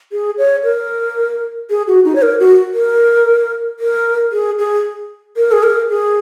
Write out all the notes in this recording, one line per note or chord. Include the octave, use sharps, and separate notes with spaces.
G#4
C#5
A#4
G#4
F#4
D#4
C#5
A#4
F#4
A#4
A#4
G#4
G#4
A#4
G#4
A#4
G#4